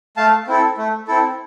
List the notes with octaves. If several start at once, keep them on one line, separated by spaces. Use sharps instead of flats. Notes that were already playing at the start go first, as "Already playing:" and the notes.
A3 F5 A5
C4 E4 A4
A3
C4 E4 A4